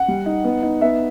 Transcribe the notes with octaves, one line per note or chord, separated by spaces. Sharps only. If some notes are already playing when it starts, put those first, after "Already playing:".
Already playing: F#5
G3
D#4
B3
D#4
B3 E5